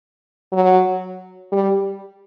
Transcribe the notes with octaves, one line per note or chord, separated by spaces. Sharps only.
F#3
G3